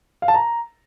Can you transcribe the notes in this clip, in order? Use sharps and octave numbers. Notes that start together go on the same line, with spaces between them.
F5
A5
A#5